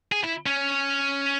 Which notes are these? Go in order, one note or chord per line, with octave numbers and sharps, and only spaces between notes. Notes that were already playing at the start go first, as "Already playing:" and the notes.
G#4
E4
C#4